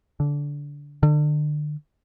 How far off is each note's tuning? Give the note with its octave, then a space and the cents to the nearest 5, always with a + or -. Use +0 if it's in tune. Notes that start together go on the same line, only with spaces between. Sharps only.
D3 -20
D3 +30